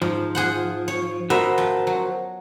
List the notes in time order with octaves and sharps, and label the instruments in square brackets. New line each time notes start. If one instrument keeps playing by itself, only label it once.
[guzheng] G#2 [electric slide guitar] F3
[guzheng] G#4 C5 F#5
C#5
[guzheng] B3 E5 [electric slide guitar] F#4 A#4 C5
[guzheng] F3
F#3